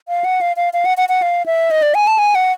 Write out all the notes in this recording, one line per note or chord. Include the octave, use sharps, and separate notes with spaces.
F5
F#5
F5
F5
F5
F#5
F#5
F#5
F5
E5
D#5
D5
G#5
A5
G#5
F#5